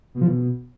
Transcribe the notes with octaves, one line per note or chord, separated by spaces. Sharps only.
B2
F3
B2